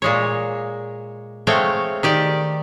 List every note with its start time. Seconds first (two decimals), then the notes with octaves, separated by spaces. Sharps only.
0.02 A#2 G#3 C#5
1.47 G#3 A3 C4 C#5 F5 G5
2.03 D#3 G4 D5